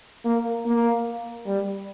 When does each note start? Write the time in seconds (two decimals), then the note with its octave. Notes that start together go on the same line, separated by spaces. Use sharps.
0.25 A#3
0.66 A#3
1.46 G3